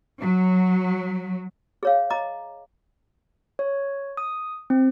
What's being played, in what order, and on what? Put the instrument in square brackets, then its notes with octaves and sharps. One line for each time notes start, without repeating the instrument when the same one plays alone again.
[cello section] F#3
[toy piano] G#4 C#5 F5
D#5 A#5 D6
[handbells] C#5
D#6
C4